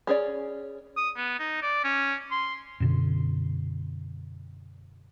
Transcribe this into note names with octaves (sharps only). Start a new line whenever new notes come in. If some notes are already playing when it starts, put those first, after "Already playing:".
C#4 G#4 C#5 D5
D#6
B3
D#4
D5
C#4
C6
F#2 B2 D3